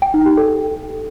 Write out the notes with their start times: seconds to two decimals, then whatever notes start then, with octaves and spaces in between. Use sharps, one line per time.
0.02 G5
0.14 D#4
0.26 G4
0.37 A4